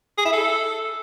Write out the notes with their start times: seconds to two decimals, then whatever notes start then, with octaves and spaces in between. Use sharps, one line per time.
0.18 G#4
0.25 E4
0.33 A4